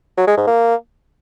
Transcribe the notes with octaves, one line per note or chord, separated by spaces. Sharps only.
F#3
G#3
G#2
A#3